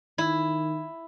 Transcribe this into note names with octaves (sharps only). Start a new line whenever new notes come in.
D#3 E4